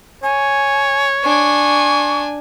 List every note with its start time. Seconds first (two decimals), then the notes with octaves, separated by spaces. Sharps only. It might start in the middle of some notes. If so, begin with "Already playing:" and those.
0.23 C#5 G#5
1.24 D4 G#5 C#6